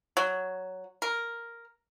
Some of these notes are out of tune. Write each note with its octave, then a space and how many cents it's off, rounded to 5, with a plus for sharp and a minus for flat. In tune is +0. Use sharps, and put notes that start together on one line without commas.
F#3 +5
A#4 +0